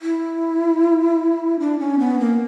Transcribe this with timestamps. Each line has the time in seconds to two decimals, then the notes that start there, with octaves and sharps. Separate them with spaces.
0.02 E4
1.60 D4
1.79 C#4
1.99 B3
2.19 A#3